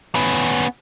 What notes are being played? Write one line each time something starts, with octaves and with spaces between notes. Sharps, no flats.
B3 C#4